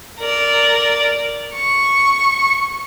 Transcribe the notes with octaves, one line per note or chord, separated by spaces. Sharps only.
A#4 D5
C#6